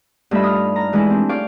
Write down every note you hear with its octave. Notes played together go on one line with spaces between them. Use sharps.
G2 A3 D#4 F4 E5 B5
D#6 F6
A#5
E3 G#3 A3 D#4 E4
C4 D4
C#5 D5 F5 G5 D6